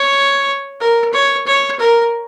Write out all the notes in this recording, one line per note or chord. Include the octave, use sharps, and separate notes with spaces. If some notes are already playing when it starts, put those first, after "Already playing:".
Already playing: C#5
A#4
C#5
C#5
A#4